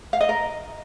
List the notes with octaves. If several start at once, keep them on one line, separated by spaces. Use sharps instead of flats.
F5
D#5
A#4